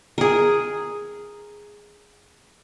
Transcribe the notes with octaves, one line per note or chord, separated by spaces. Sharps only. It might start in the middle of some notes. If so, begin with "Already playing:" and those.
G#4 A#4